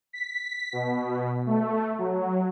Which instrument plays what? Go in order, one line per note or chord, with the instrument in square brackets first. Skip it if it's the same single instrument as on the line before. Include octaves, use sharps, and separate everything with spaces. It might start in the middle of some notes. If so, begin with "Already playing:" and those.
[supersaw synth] B6
B2
A3
F#3